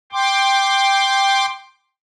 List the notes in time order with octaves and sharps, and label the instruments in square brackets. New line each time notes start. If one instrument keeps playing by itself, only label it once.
[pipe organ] G5 C6 D6